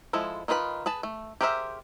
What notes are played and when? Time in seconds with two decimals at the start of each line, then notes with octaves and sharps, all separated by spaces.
0.13 F3 G#3 E4 A4
0.48 D#3 D#4 F4 B4 B5
0.86 G#4 B4 A5
1.03 A3
1.41 G4 G#4 A#4 C5 E5